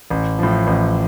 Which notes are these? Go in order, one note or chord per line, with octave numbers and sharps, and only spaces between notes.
A1
A2 F3
A1